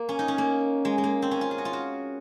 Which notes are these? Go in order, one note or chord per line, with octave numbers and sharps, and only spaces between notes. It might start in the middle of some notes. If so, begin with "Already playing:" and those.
Already playing: A#3
C#4
D#4
C#4
A#3
G#3
G#3
A#3
C4
C#4
F4
G#4
F#4
F4
F#4